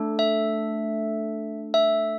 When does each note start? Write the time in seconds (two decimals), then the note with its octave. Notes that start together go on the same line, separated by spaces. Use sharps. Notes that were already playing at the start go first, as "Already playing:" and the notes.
Already playing: A3 D4 A4
0.19 E5
1.74 E5